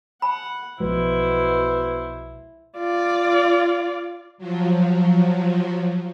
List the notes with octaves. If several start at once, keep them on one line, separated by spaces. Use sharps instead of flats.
F#5 A5 B5
B1 B2 F3 G#3 E4 C5
F4 D5
F3 F#3